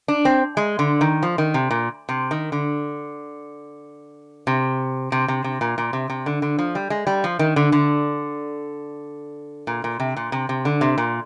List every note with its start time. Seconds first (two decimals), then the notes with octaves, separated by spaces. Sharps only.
0.08 D4
0.25 C4
0.57 G#3
0.79 D3
1.01 D#3
1.23 F3
1.38 D#3
1.54 C3
1.71 A#2
2.09 C3
2.31 D#3
2.52 D3
4.47 C3
5.12 C3
5.28 C3
5.44 C3
5.61 A#2
5.78 A#2
5.93 C3
6.10 C3
6.26 D3
6.42 D3
6.59 F3
6.75 G3
6.90 G#3
7.07 G3
7.24 F3
7.39 D#3
7.56 D3
7.72 D3
9.67 A#2
9.84 A#2
10.00 C3
10.17 A#2
10.32 C3
10.49 C3
10.65 D3
10.81 C3
10.98 A#2